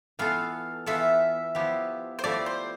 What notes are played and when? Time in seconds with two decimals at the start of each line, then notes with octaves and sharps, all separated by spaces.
0.19 E3 B3 F4 A4 F5
0.86 E3 B3 F4 A4 E5
1.55 F3 B3 E4 G4
2.19 C5
2.24 F3 A3 E4 G4 D5
2.46 C5